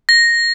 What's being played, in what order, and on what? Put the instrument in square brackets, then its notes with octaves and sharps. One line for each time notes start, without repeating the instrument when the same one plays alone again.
[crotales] A#6